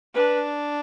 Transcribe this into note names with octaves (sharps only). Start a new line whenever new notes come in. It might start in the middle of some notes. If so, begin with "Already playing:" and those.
D4 B4